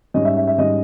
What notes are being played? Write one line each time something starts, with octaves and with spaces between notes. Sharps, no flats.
G#2 G3 C#4 D#5
E5
E5
E5
G#2 G3 C#4 D#5